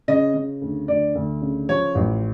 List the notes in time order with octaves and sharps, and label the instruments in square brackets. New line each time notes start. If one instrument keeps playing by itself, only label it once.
[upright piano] C#3 D#5
C#3
D2
D2 D5
D2
C#3
F3 C#5
A1